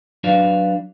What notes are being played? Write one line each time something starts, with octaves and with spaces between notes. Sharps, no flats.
F#3 D4 F#4 B4 D5 F5